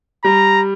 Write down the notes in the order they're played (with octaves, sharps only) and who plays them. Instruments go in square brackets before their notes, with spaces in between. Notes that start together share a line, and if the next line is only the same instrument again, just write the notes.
[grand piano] G3 [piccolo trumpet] A#5